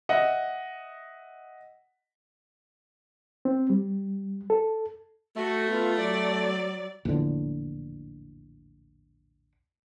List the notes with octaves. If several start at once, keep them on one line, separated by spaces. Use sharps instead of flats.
D#5 E5 F#5
C4
G3
A4
A3 F#4
B3 F4
F#3 D5
A#1 E2 A2 D3